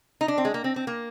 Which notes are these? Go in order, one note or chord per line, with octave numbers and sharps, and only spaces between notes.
D#4
D4
C4
G#3
A#3
C4
C4
A#3